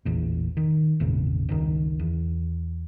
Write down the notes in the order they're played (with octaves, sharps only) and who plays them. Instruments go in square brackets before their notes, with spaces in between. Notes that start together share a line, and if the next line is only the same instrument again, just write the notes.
[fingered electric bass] A1 E2 A#2
D#3
G#1 E2 A#2 C#3
G1 C#2 D#3
E2